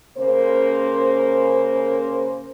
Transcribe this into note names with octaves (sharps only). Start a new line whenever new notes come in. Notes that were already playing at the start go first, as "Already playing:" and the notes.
C#3 A#3 C5